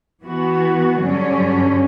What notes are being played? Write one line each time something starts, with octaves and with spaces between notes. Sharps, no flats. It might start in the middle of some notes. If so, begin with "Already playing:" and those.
E3 B3 F#4
G2 D3 F#3 C#4